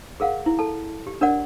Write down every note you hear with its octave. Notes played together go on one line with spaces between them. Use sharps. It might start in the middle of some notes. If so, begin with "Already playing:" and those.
G#4 A#4 F5 F#5
E4
A4 A5
G4
D4 A#4 C#5 D5 F#5